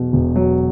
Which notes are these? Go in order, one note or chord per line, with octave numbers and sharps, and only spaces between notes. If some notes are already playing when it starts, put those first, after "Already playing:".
Already playing: E1 E2 B2 F#3
E1
F#3